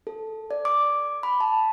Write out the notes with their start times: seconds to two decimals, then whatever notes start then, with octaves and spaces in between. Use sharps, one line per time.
0.07 A4
0.51 D5
0.65 D6
1.23 B5
1.40 A5